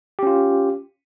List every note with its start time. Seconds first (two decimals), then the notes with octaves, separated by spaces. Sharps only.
0.19 G4
0.23 C#4
0.27 F4